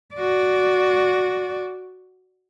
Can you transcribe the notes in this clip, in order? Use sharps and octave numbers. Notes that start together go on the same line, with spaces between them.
F#4 D5